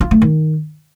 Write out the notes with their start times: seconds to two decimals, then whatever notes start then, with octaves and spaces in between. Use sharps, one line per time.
0.01 F4
0.11 A3
0.22 D#3